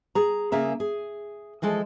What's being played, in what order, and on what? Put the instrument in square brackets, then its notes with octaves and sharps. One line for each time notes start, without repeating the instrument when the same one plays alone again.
[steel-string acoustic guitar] G#4 A#5
C#3 A#3 G#4 E5 A#5
G#4
E3 F3 G#3 A4 D#5